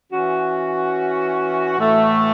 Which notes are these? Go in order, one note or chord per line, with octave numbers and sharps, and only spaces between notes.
E3 C#4 F#4
A2 E3 A3 F#4